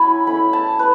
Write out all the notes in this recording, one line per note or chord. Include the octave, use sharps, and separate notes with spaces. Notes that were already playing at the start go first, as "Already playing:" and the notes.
Already playing: F#3 C#4 E4 G#5 B5
A3 C#4 E4 B5
A5
B4